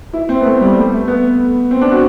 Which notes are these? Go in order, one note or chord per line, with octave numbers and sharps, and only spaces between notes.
E4
C4
B3
A3
G3
G3
A3
A3
B3
C4
D4
F#4